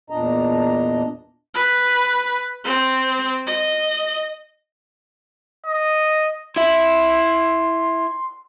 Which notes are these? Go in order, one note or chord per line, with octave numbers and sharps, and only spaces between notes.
E2 A#2 D4 D#5 A#5
B4
C4
D#5
D#5
E4 E5 C6